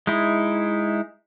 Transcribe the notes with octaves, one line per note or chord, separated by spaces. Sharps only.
G#3 D#4 E4